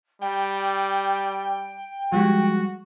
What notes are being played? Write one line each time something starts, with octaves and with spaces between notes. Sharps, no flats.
G3 G5
F3 G3 G#3 F#4